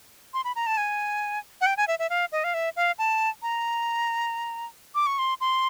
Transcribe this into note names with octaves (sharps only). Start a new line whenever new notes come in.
C6
B5
A#5
A5
G#5
F#5
G5
G#5
E5
E5
F5
D#5
F5
E5
F5
A5
A#5
D6
C#6
C6
C6